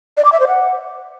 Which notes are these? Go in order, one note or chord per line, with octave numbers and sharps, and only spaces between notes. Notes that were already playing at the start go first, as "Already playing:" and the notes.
D5
D6
E5
C5
F#5